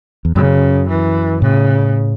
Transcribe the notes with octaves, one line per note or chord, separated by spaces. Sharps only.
E2
F#2 C#3
E3
A2 C#3